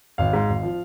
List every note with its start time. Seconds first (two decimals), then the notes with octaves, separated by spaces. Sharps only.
0.18 G#1 F5
0.33 G#2
0.49 G#1
0.63 F3